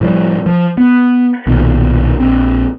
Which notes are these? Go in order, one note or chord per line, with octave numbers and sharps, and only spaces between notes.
A2 F3 G3
F3
B3
B1 A#2 D#3
A#1 C4